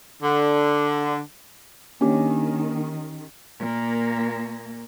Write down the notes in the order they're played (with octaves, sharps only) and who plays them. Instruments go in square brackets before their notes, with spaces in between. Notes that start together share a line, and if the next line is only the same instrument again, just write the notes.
[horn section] D3
[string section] D#3 [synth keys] A#3 D4 [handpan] C#4 G4
[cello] A#2 A#3